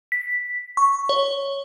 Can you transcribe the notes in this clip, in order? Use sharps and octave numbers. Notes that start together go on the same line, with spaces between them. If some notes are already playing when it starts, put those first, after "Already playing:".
B6
C#6
C#5